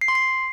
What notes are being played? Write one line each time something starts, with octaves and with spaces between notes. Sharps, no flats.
C7
C6
C7